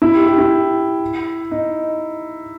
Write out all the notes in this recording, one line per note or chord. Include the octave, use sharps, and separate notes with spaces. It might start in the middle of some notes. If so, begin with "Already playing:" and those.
E4
G4
G4
E4
D#4